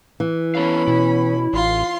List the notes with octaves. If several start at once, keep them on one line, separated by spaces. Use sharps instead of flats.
E3
B3 C#4 A4 F5 B5
B2 E4
A1 F4 C6